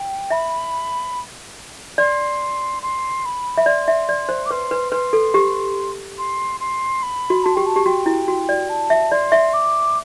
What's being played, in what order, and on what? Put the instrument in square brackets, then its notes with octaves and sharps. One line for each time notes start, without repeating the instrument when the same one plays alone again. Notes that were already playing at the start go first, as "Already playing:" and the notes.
Already playing: [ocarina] G5
[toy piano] E5 [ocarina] B5
[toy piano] D5 [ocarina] C6
[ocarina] C6
B5
[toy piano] E5
[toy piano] D5 [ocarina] C6
[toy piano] E5
D5
C5
[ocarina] D6
[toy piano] B4 [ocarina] C6
[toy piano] B4
[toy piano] B4 [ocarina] C6
[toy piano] A4
G4
[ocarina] C6
C6
B5
[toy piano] F#4
[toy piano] F#4 [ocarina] A5
[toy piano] G4 [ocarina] G5
[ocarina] A5
[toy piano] G4
[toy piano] F#4 [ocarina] G5
[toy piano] E4
F#4
D5
[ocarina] A5
[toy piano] E5
[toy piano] D5 [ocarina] C6
[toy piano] E5
[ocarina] D6